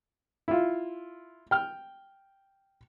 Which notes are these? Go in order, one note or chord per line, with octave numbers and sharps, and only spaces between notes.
E4 F4
G5 F6